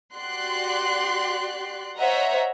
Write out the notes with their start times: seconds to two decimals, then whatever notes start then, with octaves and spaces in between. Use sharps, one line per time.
0.15 F#4 G4 D5 C6 F#6
1.97 C5 C#5 D#5 E5 F#5 A#5